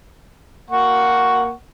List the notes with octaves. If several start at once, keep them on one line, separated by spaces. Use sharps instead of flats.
A#3 F#5 C#6